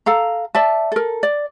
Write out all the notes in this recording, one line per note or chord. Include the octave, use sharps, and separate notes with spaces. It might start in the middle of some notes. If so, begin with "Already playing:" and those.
A4 F5 A#5
D5 E5 A5
A4 A#4
D5